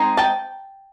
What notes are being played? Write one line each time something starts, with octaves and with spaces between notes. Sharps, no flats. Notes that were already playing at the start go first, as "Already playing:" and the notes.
Already playing: G#3 C4 D#4
G5 A5